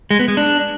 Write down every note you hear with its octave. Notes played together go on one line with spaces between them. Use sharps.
G#3
B3
G#3
D4